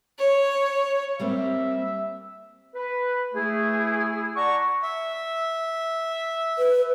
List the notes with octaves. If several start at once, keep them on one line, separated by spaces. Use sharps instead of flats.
C#5
G3 A#3 C4 E5
B4
A3 E4 G#4
D5 F#5 A5 A#5 C#6
E5
B4